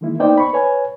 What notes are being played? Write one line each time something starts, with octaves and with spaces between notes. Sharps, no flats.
D#3 E3 G#3 A#3 E4
A#3 B3 D#4 C5 D5 G5
B5 C#6
B4 C#5 G#5